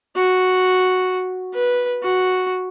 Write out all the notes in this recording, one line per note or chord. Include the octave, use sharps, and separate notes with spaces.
F#4
B4
F#4